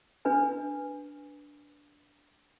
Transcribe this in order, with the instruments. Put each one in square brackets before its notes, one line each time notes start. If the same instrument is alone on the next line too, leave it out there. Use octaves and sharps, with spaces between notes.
[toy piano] D4 B4 G#5